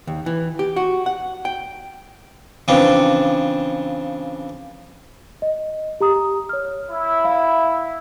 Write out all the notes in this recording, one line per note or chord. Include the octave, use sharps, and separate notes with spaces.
D#2
E3
G4
F#4
F#5
G5
C#3 E3 F3 C4 D4
D#5
G4 A#5 D#6
C#5 F6
E4
E5 F5 B5